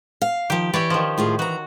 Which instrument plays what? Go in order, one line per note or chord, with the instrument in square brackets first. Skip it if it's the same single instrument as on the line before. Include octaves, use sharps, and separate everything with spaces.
[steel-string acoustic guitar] F5
[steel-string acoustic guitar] D#3 F3 [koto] G4
[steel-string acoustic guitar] E3 [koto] G4 C#5 D5
[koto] D#3 F3
[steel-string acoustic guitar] A2 F4 G#4
[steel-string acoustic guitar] E3 A#5 [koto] F#4